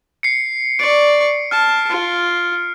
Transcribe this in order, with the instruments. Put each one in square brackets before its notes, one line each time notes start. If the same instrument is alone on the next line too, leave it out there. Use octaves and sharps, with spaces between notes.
[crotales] C7 C#7
[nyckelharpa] D5 C#6 [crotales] D7
[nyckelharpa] A5 [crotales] F6
[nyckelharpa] F4